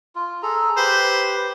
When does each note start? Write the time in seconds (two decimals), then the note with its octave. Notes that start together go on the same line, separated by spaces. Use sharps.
0.15 F4
0.42 G#4 A4 A#5
0.77 G4 B4 C5 B5